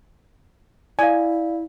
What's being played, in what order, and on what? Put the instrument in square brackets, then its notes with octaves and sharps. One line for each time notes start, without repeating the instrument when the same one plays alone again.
[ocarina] E4 [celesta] D5 F5 [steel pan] G#5